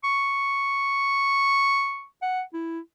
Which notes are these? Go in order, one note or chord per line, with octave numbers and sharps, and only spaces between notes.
C#6
F#5
E4